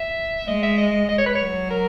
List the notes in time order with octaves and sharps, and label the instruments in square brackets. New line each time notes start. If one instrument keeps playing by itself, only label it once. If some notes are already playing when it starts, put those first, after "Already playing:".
Already playing: [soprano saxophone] E5
[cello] G#3 [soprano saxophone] D#5
[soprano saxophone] E5
D#5
D#5
C#5
B4
[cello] F#3 [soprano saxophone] C#5
[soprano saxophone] A#4